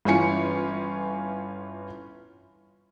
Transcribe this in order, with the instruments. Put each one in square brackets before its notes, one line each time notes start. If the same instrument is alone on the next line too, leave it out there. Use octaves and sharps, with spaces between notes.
[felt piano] G1 E3 C#4 F4 G#5 C#7